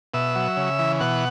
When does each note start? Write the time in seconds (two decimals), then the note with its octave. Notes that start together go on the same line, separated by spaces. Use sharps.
0.14 B2 E5
0.35 F#3
0.57 C#3
0.79 E3
1.00 B2 F#5